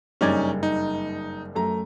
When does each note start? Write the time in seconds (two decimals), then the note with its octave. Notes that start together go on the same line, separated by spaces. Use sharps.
0.21 F#1 G2 C#4 D#4 D5 G#6
0.63 D#4
1.55 F#2 A3 A#5